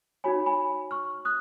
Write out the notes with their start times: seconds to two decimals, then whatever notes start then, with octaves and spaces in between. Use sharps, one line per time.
0.24 D#4 F#4 C#5 G#5 B5
0.46 G#5 B5
0.91 C#6 F6
1.25 D#6 F#6